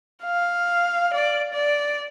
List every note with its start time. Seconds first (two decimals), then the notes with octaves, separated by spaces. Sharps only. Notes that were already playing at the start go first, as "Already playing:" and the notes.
0.24 F5
1.14 D5
1.54 D5